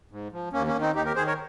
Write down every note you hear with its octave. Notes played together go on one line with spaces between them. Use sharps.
G#2
F3
D#2 A#3 C#4
A#3 C#4
D#3
C4 D#4
D#2 D#4 G4
G4 A#4
D#3 G#4 C5
A#4 C#5